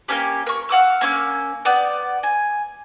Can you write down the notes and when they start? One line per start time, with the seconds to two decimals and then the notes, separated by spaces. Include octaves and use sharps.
0.08 A#3 B3 C#4 G4
0.47 A#4 C#6
0.69 F5 F#5 D6 E6
1.01 A#3 C#4 E6
1.65 B3 D5 G5
2.23 G#5